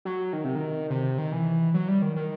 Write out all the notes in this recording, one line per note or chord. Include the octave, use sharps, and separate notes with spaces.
F#3
D#3
C3
D#3
C3
D#3
E3
F#3
G3
D#3
D#3